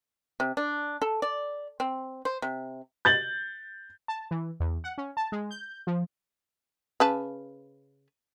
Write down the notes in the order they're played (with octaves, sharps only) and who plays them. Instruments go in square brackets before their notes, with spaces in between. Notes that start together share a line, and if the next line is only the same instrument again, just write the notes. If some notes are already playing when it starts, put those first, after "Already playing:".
[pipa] C3
D4
A4
D5
C4
C5
C3
[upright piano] G6 A6 F#7
[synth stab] A5
E3
E2
F#5
C#4
A5
G#3
G6
F3
[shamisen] C#3 B4 A5